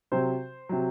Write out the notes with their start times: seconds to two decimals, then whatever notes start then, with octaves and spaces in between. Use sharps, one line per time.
0.12 C3 F#3 C5
0.69 C3 F#3